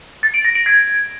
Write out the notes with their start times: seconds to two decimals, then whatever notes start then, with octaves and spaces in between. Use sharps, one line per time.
0.23 A6
0.34 D7
0.45 A#6
0.55 D7
0.66 G#6